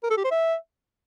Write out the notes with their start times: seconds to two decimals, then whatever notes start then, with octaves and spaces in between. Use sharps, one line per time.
0.03 A#4
0.10 A4
0.17 G4
0.24 C5
0.31 E5